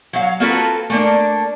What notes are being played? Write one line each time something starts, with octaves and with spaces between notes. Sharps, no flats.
F#3 F5
A#3 C4 F4 F#4 A4 B4
A3 A#3 D4